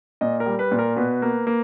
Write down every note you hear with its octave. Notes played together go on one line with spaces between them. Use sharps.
A#2 D#5
A#4
G3
B4
A#2
A#4
B2 B4
A#3
A#3